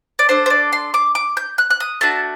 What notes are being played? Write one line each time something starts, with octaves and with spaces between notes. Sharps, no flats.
D5
D4 A4 C5
C5
D5
C6
D6
D6
G6
F#6
F#6
D#6
A3 D4 F#4 A5